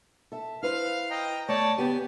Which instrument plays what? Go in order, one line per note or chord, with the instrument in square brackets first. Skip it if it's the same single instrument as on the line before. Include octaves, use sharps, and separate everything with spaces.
[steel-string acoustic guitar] A4 E5
[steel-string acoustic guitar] E4 B4 C5 [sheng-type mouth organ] F5 F6
[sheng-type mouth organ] D#5 G5 A#5
[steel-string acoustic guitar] A3 [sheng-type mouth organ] C#5 D5 A5
[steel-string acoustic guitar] C#3 B3 G#5 [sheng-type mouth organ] G4